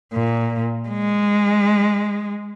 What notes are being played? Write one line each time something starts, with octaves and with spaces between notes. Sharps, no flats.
A#2
G#3